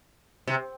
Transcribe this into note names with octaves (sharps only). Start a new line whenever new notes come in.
C3